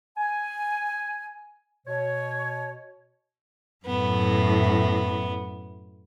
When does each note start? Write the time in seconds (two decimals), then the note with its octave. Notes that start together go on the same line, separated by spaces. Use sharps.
0.17 G#5
1.87 B2 C#5
3.86 F#2 A2 B3